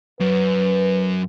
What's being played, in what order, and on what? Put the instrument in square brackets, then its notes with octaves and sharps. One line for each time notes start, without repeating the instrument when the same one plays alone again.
[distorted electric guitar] F#2 [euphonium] B4